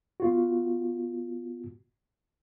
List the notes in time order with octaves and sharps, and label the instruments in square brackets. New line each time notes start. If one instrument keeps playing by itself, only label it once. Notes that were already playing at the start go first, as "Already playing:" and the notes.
[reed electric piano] B3 F4 F#4